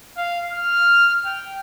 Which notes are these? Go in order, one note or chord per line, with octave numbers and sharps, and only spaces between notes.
F5
F6
G5